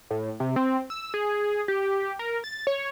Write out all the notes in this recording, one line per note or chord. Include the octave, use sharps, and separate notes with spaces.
A2
C3
C4
E6
G#4
G4
A#4
A6
C#5